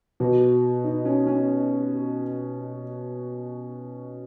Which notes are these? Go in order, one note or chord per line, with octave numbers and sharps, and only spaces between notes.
B2 B3 F#4
D#4
C#4
C#4